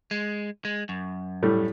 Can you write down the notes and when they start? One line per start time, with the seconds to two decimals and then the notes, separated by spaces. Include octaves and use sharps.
0.11 G#3
0.65 G#3
0.89 F#2
1.43 A2 G3 A3